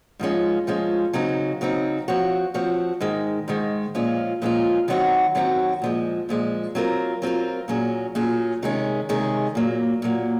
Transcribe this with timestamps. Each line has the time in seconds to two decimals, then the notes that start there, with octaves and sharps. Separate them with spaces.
0.19 G#2 F3 G#3 C#4 F4
0.67 G#2 F3 G#3 C#4 F4
1.13 C#3 F#3 C4 D#4
1.61 C#3 F#3 C4 D#4
2.08 F3 C4 F#4 C#5
2.54 F3 C4 F#4 C#5
3.00 G#2 D#3 G#3
3.48 G#2 D#3 G#3
3.95 A#2 F3 G#3 C#4 F4
4.42 A#2 F3 G#3 C#4 F4
4.88 F#2 D#3 F#3 C4 F#4
5.35 F#2 D#3 F#3 C4 F#4
5.82 A#2 F3 G#3
6.29 A#2 F3 G#3
6.75 F#3 C4 F4 A#4
7.22 F#3 C4 F4 A#4
7.68 A#2 F#3 C#4 G#4
8.15 A#2 F#3 C#4 G#4
8.62 C3 D#3 G#3 C#4 G#4
9.09 C3 D#3 G#3 C#4 G#4
9.55 A#2 F#3 A#3
10.02 A#2 F#3 A#3